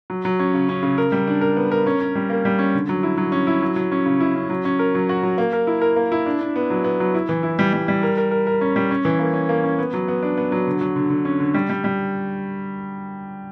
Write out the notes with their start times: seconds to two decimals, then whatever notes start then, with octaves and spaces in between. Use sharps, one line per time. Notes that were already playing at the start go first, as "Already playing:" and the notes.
0.10 F#3
0.25 F#3
0.39 C#4
0.54 C#3
0.69 C#4
0.83 C#3
0.98 A#4
1.12 G3
1.28 D4
1.41 A#4
1.57 B3
1.72 A#4
1.86 C#4
2.00 C#4
2.15 G3
2.30 A#3
2.45 G3
2.59 C#4
2.74 D3
2.89 F#3
3.03 E4
3.18 F#3
3.32 C#4
3.47 E4
3.62 F#3
3.76 F#3
3.92 C#4
4.06 C#3
4.20 E4
4.36 C#4
4.50 F#3
4.65 C#4
4.79 A#4
4.95 F#3
5.09 F#4
5.23 F#3
5.38 A#3
5.53 A#4
5.67 E4
5.82 A#4
5.96 A#3
6.12 E4
6.26 D4
6.41 D4
6.56 B3
6.70 F#3
6.84 B3
7.00 F#3
7.14 E4
7.29 E3
7.43 E4
7.59 G3
7.73 G3
7.88 G3
8.03 A#4
8.18 A#4
8.31 A#4
8.47 A#4
8.61 C#4
8.76 G3
8.91 C#4
9.05 E3
9.19 A#3
9.34 C#4
9.49 A#3
9.64 C#4
9.79 B3
9.93 F#3
10.08 B3
10.23 D4
10.37 B3
10.52 F#3
10.67 D3
10.81 F#3
10.96 D3
11.10 D3
11.25 C#4
11.40 D3
11.54 G3
11.70 G3
11.84 G3